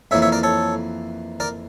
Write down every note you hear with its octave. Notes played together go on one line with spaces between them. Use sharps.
F2 E3 A#3 C#5 E5
C#5 E5
A#4 D5
A4 C#5
A#4 D5